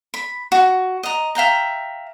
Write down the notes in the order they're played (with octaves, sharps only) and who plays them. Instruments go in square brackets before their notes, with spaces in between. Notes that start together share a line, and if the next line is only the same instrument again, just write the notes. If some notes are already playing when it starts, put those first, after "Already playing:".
[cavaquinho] B5
F#4
D#5 A#5
E5 F5 G5 A#5